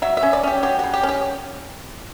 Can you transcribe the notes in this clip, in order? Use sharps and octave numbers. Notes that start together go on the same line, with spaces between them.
F#3 E5
E5
C#4
D5
C#4 G4
F#3 G4
C#3 F#4
G4
C#4
G4